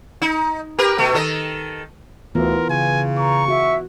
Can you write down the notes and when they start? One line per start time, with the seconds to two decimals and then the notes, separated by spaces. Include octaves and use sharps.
0.22 D#4
0.79 G4 A#4 B4
0.98 B2 A3
1.14 D#3 A4 D#5
2.35 D2 E3 B3 F4 A#4
2.69 C#3 G#5
3.18 A#5 C#6
3.48 F#4 E5